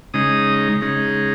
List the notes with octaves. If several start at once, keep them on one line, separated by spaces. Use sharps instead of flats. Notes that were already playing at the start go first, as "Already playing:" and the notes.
C#3 G#3 D#4 D#6
C#3 G#3 D#4